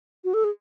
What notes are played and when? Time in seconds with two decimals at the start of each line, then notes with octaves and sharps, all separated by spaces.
0.24 F#4
0.34 A4
0.44 G#4